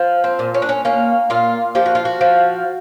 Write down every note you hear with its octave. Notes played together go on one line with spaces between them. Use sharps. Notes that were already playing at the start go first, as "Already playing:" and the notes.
Already playing: F3
C4
A#2
C#4
D4
C#4
A#3 C#4
A#2 F4
F3 G4
F#4
F4
F#4
F3